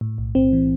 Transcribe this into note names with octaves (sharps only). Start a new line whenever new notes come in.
A2
B1
B1 C4
E3